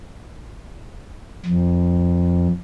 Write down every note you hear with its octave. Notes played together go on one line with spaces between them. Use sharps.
F2